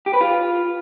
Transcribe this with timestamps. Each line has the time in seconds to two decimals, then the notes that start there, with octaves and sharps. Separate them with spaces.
0.06 G4
0.13 B4
0.21 F4